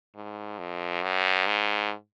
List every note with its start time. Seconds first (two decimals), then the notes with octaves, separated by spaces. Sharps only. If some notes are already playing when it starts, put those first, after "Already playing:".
0.15 G#2
0.59 F2
1.02 F#2
1.46 G#2